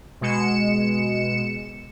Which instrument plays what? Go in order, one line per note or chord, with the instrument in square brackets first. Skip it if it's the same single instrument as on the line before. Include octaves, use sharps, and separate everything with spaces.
[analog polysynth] B2 G#3 C#7 E7